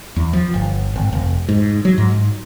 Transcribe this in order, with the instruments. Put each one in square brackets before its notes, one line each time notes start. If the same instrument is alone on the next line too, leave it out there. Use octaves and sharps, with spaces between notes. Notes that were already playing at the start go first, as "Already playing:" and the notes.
[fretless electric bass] E2
F3
G1
G#1
F1
G#2
F#3
G#2